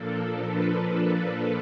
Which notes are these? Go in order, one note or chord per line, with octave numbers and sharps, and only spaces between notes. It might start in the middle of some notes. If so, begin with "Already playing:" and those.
Already playing: A#2 F3 A#3 D4 A4
B4